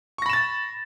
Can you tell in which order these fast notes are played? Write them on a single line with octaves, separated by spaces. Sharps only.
C#6 A#6 B5 E7 A6